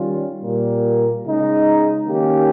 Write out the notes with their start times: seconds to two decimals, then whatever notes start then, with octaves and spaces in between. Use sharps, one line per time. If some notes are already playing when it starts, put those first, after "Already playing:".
Already playing: D#3 G3 C#4 F4
0.42 A#2 G3 A#3
1.25 C#3 G#3 D#4
2.07 D#3 A#3 C#4 G4